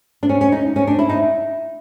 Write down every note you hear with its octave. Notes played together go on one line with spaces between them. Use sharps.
D4
C#4
C#4
D#4
C#4
D4
E4
D#4